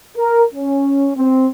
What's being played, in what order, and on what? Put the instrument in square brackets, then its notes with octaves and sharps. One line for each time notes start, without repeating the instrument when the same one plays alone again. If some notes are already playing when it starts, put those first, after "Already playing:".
[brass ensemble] A#4
C#4
C4